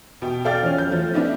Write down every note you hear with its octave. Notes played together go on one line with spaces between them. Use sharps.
B2 G5
A4 D5 F5 G5 F6 A6
F3 C#4
G6
F3 A3
B3 D4 D#4 E5